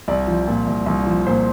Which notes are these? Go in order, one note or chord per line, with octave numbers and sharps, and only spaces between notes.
C2 D5
F3
A#2
C2
C2
F3
A#2 C5